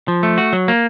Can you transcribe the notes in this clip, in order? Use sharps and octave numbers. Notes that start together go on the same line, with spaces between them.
F3
A3
F#4
F#3
A#3